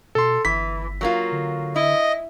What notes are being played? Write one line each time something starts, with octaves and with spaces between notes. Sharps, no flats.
B2 A4 C6
G1 E3 B6
F#3 A#3 F4
D3
E4 D#5